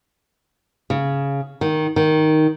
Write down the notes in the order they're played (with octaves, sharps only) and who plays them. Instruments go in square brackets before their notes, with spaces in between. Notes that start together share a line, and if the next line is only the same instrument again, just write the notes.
[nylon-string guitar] C#3
D#3
D#3